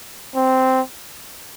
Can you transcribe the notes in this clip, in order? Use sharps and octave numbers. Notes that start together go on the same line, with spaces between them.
C4